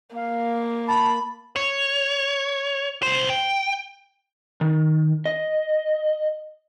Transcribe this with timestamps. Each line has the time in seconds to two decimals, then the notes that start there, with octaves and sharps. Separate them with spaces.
0.16 A#3 F5
0.88 A5 B5
1.56 C#5
3.03 C2 C5
3.30 G5
4.61 D#3
5.26 D#5